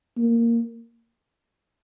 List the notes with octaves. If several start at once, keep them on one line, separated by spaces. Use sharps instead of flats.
A#3